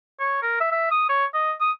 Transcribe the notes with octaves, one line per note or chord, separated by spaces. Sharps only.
C#5
A#4
E5
E5
D#6
C#5
D#5
D#6